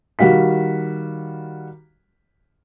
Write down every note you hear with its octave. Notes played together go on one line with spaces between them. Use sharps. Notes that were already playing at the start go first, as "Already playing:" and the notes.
D#3 G3 F#4 F5 B6